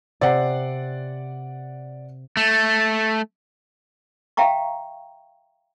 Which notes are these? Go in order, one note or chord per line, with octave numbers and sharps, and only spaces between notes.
C3 D5 F#5 C7
A3
E5 F5 G5 A#5 C#6